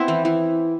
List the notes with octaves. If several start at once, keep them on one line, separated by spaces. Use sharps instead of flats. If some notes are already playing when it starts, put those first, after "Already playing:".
Already playing: B3 C4 E4
E3
E3